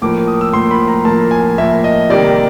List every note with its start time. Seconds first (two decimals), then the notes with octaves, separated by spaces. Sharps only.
0.02 A2 F3 A#3 D6
0.28 D#6
0.41 E6
0.53 A2 F3 A#3 C6
0.71 B5
0.88 A#5
1.05 A2 F3 A#3 A5
1.31 G#5
1.57 A2 F3 A#3 E5
1.84 D#5
2.10 C3 D#3 G3 A#3 D5